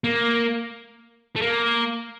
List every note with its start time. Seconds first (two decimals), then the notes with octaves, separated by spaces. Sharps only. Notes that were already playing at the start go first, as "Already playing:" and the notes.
0.04 A#3
1.36 A3
1.42 A#3